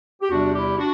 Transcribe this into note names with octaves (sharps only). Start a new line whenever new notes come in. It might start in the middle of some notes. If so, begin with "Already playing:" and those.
G4
E2 C3 G3 D4 F#4
E4 G4
D4 F#4